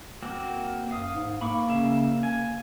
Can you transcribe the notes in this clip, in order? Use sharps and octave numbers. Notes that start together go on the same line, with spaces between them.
A#3 C4 F#4
F#2 F5 D#6
G#2
A#3 B5 C#6 D6
C#3 E5
G#5